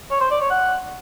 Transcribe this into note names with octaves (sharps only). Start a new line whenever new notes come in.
C#5
C5
D5
C#5
F#5